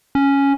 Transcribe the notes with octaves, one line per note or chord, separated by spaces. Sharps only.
C#4